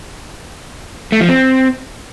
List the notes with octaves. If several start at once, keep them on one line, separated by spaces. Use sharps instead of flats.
A3
F3
C4